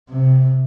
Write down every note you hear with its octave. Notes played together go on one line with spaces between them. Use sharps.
C3